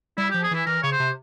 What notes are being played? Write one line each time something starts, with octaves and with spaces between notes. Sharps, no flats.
G3 E4
G4
F3
G#4
E3 E4
E3 A#4
C#3 C#5
C5
C3